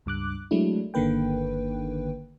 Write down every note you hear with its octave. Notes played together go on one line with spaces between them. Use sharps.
C#2 G2 D6 F#6
F#3 G#3 A3 D4 E4
G1 D3 D#3 A#3 B4 G5